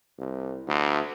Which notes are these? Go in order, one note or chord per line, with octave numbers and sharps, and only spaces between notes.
C2
D2